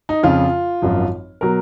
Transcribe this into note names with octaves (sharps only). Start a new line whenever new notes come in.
D#4
F2 C#3 F3 F4
G#1 F#2 F3
B2 F#3 A#4